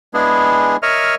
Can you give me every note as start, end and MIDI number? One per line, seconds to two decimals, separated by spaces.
0.14 0.77 56
0.14 0.77 59
0.14 0.77 62
0.14 0.77 64
0.14 0.77 68
0.83 1.15 70
0.83 1.15 73
0.83 1.15 75
0.83 1.15 76
0.83 1.15 89